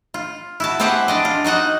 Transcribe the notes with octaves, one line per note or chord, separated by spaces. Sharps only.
F4
E4 F#4 A5
B3 C4 G4 C5 F#5 G#5
D4 D5 D#5
F4
D#4 F#4 D#5 F#5